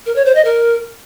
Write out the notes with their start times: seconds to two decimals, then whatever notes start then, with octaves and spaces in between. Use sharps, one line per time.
0.06 A#4
0.16 C#5
0.25 C5
0.35 D#5
0.45 A#4